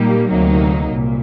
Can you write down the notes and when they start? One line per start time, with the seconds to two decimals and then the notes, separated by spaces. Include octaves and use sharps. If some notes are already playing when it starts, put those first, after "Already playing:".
Already playing: A#2 G3 A#3 D#4 G4
0.29 D2 C3 F#3 A#3 D#4
0.90 C2 A#2